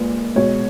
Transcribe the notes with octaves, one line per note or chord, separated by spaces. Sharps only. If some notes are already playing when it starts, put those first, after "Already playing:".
Already playing: A#2 G#3 B4
B2 G#3 C#5